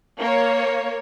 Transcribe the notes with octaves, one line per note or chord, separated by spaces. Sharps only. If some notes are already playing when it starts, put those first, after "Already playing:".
A#3 C#5